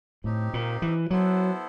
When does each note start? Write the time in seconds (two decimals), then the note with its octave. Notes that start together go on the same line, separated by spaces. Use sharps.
0.24 A2 C4 D#4 G4
0.54 A#2
0.82 E3
1.10 F#3 B3 E4 A4 C5